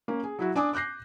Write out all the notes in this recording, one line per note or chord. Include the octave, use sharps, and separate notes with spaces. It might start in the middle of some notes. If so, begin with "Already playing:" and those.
A#3 C#4
G#4
F#3 E4 F#4
D4 G#5 D6 D#6
D6 F#6 G6 A#6 C7